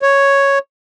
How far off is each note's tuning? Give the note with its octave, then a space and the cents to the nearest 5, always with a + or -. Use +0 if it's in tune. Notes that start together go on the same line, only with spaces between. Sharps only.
C#5 +0